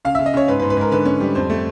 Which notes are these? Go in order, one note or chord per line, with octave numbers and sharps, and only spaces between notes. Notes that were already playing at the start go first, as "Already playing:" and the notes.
C#3 F5
E5
C#3
D#5
C#3 C#5
G#2 B4
G#2 B4
B4
G#2 A#4
D3 B4
C#4
G3
F2 C5
A3